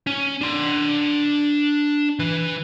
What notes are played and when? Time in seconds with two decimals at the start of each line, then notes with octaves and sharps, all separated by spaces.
0.07 C#4
0.41 D4 C6
2.19 E3 B4